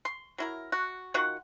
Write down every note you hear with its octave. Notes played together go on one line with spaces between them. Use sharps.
C6
F#3 E4 A#4
F#4
D#3 F4 F#4 F#5